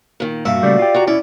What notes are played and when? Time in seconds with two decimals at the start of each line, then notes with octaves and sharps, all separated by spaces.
0.20 A#2 D#3
0.45 G2 A#2 F#4 E5 F5
0.63 C#3 G3 A3 D5
0.79 F4 G4
0.94 F#4 F#5 A#5
1.08 C#4 E4 D5